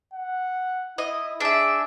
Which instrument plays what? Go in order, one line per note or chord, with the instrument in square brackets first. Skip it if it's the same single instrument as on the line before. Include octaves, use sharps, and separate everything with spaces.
[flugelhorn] F#5
[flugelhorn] E4 [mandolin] D#5
[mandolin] D4 E5 [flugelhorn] G#4